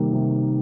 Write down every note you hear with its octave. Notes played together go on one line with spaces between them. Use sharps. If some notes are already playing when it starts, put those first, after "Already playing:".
Already playing: C3 D#3 G3 A#3
C3